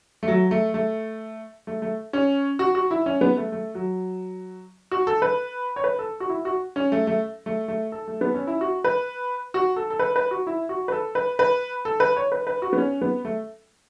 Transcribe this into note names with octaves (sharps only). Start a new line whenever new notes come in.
A3
F#3
A3
A3
A3
A3
C#4
F#4
F#4
E4
C#4
B3
A3
A3
F#3
F#4
A4
B4
C#5
B4
A4
F#4
E4
F#4
C#4
A3
A3
A3
A3
A4
A3
B3
C#4
E4
F#4
B4
F#4
A4
A4
B4
B4
F#4
E4
F#4
B4
A4
B4
B4
A4
B4
C#5
B4
B4
F#4
B3
C#4
B3
A3